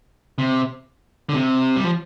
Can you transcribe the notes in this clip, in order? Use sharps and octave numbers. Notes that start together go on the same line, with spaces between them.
C3
D3
C3
G3
F3